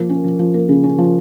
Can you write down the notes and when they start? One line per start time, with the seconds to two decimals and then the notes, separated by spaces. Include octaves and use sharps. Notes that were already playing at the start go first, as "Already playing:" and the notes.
Already playing: F3 A#3
0.09 C#4
0.24 F3
0.39 F3
0.54 A#3
0.69 C#3
0.83 C#4
0.98 F3